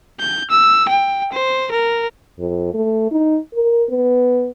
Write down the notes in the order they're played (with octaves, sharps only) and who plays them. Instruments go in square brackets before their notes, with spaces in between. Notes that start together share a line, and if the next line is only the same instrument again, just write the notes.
[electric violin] G6
E6
G5
C5
A#4
[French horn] F2
A3
D#4
A#4
B3